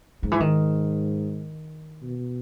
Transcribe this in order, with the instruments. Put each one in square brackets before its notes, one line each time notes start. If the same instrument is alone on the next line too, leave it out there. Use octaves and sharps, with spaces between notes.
[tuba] G#2 [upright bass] D#3
[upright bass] E3
D#3
[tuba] B2